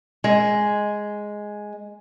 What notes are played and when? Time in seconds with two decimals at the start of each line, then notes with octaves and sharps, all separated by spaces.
0.24 G#3